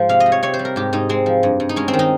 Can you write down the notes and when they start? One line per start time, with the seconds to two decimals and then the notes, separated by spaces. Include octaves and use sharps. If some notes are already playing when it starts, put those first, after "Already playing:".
Already playing: G#2 F3 G#3 C5
0.09 C3 F5
0.20 D#5
0.26 G3
0.32 C#5
0.43 C3 C#5
0.54 C5
0.59 G3
0.65 A#4
0.76 G#2 G4
0.93 G#2 D#4
1.09 G#3 C4
1.26 F3
1.43 G2
1.60 G2
1.69 D#4
1.76 G#3 C#4
1.88 C4
1.93 D#3
1.99 D#4